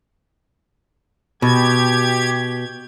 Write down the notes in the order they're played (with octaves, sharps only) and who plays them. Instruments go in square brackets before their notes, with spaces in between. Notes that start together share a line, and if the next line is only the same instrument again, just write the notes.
[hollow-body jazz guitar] B2 [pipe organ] G4 G#6